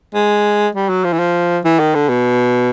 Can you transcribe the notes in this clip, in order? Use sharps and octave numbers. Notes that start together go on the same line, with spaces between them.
G#3
G3
F#3
F3
E3
F3
E3
D#3
D3
B2